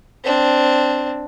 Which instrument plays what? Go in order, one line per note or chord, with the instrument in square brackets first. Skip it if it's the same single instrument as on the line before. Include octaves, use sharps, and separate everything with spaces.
[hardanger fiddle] C4 D4